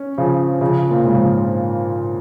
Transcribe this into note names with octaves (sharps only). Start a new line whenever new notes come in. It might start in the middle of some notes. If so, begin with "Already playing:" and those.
Already playing: C#4
C#3 F3
C#3 F3
A#2
G#2 C#3
C#3 F3